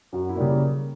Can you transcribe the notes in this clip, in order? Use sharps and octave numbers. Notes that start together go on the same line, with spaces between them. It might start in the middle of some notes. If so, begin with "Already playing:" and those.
F#2 F#4
E4
C#3 G3 A#3